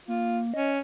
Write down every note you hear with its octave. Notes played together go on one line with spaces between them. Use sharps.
A#3 F4
C#4 D#5